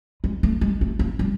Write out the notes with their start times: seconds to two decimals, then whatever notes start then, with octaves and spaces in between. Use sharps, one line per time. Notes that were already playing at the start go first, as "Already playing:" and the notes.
0.24 G#3
0.43 A3
0.61 G#3
0.81 A3
0.99 A#3
1.19 G3